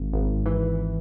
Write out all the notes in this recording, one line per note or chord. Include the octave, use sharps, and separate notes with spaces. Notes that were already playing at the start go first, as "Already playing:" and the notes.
Already playing: G#1
G#1
E3